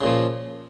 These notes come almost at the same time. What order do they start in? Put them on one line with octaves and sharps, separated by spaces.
C#3 A#2 F3